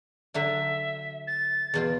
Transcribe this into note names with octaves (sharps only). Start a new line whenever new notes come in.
D3 F#3 D4 E5
A6
E2 B2 F4